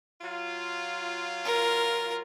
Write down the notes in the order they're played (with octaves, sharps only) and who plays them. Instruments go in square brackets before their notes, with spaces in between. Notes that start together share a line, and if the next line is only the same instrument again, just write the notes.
[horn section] F#3 F4
[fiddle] A#4